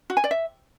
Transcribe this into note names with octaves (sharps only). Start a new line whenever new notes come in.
F#4
G#5
D5
E5